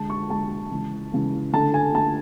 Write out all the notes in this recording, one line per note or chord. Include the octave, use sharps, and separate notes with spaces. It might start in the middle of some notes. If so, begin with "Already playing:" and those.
Already playing: D3 G#3 A5
C#6
D3 G#3 A5
C#3 E3 G#3
C#3 E3 G#3
D3 A3 A5
G#5
D3 A3 A5